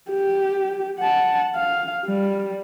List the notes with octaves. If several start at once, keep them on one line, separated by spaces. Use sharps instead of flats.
G4
F#5 A5
F5
G3